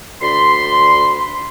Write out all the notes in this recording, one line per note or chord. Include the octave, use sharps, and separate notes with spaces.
D2 D5 B5 C6